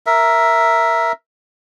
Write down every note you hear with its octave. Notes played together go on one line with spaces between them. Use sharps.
A#4 E5